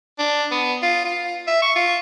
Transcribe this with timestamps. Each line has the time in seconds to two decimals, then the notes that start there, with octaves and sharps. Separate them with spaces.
0.19 D4
0.51 B3
0.82 F4
1.05 F4
1.47 E5
1.62 C#6
1.76 F4